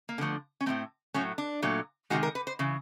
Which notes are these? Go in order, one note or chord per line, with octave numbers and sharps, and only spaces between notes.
A#3
D3 F3 A3 B3
C#4
A2 F#3 A3 C4
A2 F#3 A3 C#4
D4
A#2 F#3 A3
C3 D#3 G#3 F#4
A#4
B4
C5
C#3 E3